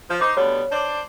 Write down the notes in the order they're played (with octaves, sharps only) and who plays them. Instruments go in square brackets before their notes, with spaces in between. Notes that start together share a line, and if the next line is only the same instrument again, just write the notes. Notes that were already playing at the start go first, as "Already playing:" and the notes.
[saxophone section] F3
[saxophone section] D#4 C5 [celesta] D6
[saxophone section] D2 G3 B3 [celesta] C#5
[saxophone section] D4 C5 D5